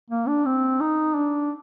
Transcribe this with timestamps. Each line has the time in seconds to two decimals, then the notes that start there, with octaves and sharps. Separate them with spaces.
0.10 A#3
0.28 D4
0.46 C4
0.80 D#4
1.15 D4